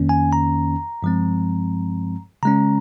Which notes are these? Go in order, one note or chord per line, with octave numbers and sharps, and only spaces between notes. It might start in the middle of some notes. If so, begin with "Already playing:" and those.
Already playing: F2 D#3 A#3 C#4
G#5
A#5
G2 F3 G#3 C4
C#3 G#3 C#4 A#5